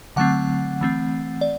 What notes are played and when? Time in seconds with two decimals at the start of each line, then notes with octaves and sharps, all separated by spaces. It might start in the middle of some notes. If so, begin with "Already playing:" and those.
0.16 D3 F#3 A3 C4 F#5
0.81 E3 A3 C4
1.41 D5